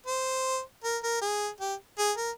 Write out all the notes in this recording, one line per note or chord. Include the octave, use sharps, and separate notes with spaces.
C5
A#4
A#4
G#4
G4
G#4
A#4